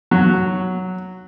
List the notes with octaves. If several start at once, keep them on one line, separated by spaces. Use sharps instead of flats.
F#3